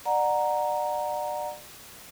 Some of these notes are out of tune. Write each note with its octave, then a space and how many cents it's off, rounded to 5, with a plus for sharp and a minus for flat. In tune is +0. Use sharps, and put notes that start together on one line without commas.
D5 +30 F#5 -10 A#5 +0